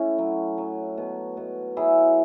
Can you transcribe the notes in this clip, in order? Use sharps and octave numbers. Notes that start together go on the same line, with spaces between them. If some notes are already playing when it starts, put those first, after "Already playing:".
Already playing: A3 C#4 E4
F#3
F#3
B2
B2
F#3 E4 G#4